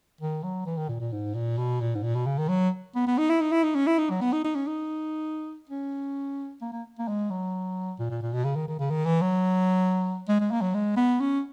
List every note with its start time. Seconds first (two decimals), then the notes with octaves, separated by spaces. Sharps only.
0.21 D#3
0.43 F#3
0.66 E3
0.77 D#3
0.89 A#2
1.00 A#2
1.12 G#2
1.35 A#2
1.58 B2
1.80 A#2
1.95 G#2
2.03 A#2
2.15 B2
2.26 C#3
2.38 D#3
2.49 F#3
2.95 B3
3.07 B3
3.18 D#4
3.30 E4
3.41 D#4
3.52 E4
3.63 D#4
3.75 C#4
3.87 E4
3.98 D#4
4.10 F#3
4.21 B3
4.33 D#4
4.44 D#4
4.55 C#4
4.67 D#4
5.69 C#4
6.61 A#3
6.72 A#3
6.99 A#3
7.08 G#3
7.30 F#3
7.99 A#2
8.10 A#2
8.22 A#2
8.33 B2
8.45 C#3
8.56 D#3
8.68 D#3
8.79 C#3
8.90 D#3
9.06 E3
9.21 F#3
10.28 G#3
10.40 G#3
10.51 A#3
10.62 F#3
10.74 G#3
10.96 B3
11.20 C#4